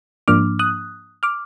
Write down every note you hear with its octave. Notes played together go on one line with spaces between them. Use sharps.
G#2 F3 A#3 D4 D6 F6
D#6 F#6
D6 F6